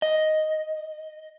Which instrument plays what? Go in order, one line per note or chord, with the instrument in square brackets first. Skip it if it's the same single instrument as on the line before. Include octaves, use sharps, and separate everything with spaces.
[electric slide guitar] D#5